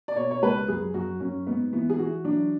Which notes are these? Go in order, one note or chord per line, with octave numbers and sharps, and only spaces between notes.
D5
B2 C#5
C#5
C#2 B4
F#2 G#4
F#2 F#4
F#2 C#4
G#2 B3
E3 B3
G#4
E3 F#4
F#3 D4